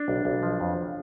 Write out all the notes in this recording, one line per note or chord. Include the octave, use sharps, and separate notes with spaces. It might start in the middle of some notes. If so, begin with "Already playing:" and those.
Already playing: D4
B1
B1
F3
F2